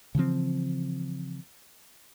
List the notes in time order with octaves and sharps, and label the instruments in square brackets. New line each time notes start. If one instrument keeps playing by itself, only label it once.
[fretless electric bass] C#3 E3 F3 C4